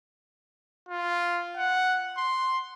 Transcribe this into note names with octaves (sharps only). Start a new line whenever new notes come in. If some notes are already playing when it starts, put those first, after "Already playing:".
F4
F#5
C6